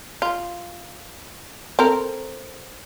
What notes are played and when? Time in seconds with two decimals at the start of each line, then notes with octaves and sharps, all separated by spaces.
0.22 F4
1.79 C4 A4 A#4